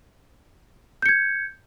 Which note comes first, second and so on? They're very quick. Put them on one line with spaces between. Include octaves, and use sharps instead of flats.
G6 C#7 G#6